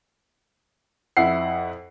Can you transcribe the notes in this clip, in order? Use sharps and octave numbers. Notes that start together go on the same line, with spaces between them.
F2 E4 F#5 C7